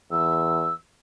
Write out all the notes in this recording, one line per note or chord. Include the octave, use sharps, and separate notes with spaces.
E2 E6